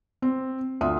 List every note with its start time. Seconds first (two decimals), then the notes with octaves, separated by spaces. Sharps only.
0.22 C4
0.81 D2 F4 E5 D#6